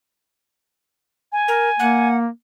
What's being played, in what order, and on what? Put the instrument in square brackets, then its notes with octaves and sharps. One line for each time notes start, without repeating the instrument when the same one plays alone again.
[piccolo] G#5
[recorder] A#4
[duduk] A#3 [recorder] F#5